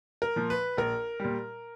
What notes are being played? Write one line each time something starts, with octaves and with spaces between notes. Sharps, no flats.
A#4
A#2 F3
B4
A#1 A#4
A#2 G3